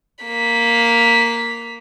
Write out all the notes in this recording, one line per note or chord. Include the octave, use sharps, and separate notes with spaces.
A#3 B6